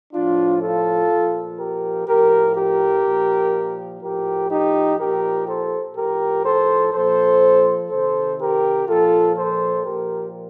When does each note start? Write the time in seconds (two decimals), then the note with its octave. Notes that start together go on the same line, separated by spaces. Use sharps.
0.13 A2 F3 D4 F4
0.61 F4 A4
1.10 A#2 F3
1.58 G4 A#4
2.07 A2 F3 G4 A#4
2.55 G4 A#4
3.04 A#2 F3
4.01 A2 F3 G4 A#4
4.50 D#4 G4
4.98 A#2 F3 G4 A#4
5.47 A4 C5
5.95 A2 F3 G4 A#4
6.44 A4 C5
6.93 A#2 F3 A4 C5
7.91 C3 D#3 A4 C5
8.39 G4 A#4
8.87 A#2 F3 F4 A4
9.36 A4 C5
9.85 A#2 F3 G4 A#4